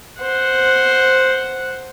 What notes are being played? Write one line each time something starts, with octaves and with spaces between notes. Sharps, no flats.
C5 F#5